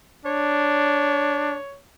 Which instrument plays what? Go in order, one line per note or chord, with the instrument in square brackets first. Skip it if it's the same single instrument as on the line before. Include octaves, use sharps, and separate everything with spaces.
[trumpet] D4 [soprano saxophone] C#5